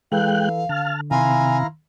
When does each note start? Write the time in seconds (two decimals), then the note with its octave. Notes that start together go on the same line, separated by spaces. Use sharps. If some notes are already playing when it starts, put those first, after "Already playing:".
0.12 E3 G#3 A4 B4 F5 G5 F#6
0.69 D3 A5 F6
1.11 C3 D#3 E4 F5 G#5 A#5 C6